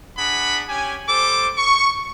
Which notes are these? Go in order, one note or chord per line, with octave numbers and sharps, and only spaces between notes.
D4 G#4 F#5 B5
C#4 G4 G#5
G3 A4 C5 D6
C#6